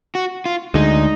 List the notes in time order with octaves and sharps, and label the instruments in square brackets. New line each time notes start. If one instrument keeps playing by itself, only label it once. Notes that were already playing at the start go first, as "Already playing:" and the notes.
[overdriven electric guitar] F#4
F4
[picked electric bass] D2 D3 G#3 [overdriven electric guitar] D#4